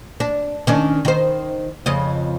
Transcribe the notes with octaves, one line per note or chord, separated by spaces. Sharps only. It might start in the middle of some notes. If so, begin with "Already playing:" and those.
D4
D#3 C#4 D4
D#3 C5
F2 C#3 D#5